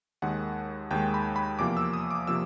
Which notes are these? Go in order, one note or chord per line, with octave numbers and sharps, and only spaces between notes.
D#2 D#3 G#3 F#5
D#2 D#3 G#3 G5
B5
B5
E2 C3 F3 A#3 D6
E6
D#6
D6
C3 F3 A#3 E6